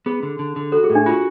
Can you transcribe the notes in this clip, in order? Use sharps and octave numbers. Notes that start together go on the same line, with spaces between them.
B3 G#4
D3
D3
D3
F#4 A4
G#4
A2
D4
F4 F#4